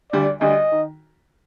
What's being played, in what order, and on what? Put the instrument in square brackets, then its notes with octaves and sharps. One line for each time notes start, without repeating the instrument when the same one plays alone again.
[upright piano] D2 D3 G3 [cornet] D5
[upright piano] D2 D3 G3 [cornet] D#5
[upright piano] D#3